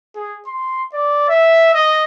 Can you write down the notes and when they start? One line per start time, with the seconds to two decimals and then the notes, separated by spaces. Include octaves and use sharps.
0.16 G#4
0.47 C6
0.94 D5
1.29 E5
1.74 D#5